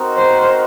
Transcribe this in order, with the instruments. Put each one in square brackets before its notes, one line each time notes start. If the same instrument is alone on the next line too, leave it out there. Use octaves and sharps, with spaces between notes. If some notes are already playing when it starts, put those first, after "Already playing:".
Already playing: [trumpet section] C4 D#4 F#4 A#4 D#5
[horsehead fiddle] C5